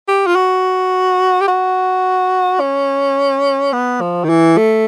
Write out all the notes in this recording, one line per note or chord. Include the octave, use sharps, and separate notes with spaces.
G4
F4
F#4
G4
F#4
C#4
B3
F3
D#3
E3
A3